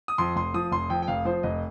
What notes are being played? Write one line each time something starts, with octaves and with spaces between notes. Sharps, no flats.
D#6
F2 C6
F1 C6
F3 D#6
F1 C6
F2 G5
G5
F1 F5
F3 C5
F1 D#5